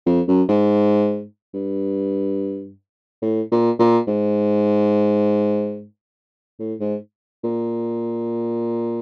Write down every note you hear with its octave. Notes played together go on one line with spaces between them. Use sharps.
F2
F#2
G#2
G2
A2
A#2
A#2
G#2
A2
G#2
A#2